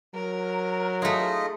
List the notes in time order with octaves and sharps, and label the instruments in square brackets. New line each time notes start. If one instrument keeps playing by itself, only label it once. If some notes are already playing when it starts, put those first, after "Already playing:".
[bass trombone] F#3 [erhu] A#4
[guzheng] A3 G#4 [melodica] D#4 F4 D#5